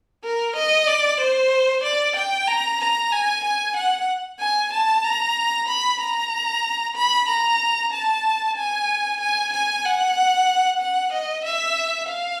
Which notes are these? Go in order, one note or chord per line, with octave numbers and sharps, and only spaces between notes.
A#4
D#5
D5
C5
D5
G5
A#5
A#5
G#5
G#5
F#5
G#5
A5
A#5
B5
A#5
B5
A#5
A5
G#5
G#5
G#5
F#5
F#5
D#5
E5
F5